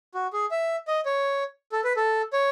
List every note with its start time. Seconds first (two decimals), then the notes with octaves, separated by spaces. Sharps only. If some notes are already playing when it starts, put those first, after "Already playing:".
0.14 F#4
0.33 G#4
0.51 E5
0.88 D#5
1.05 C#5
1.72 A4
1.84 B4
1.96 A4
2.33 C#5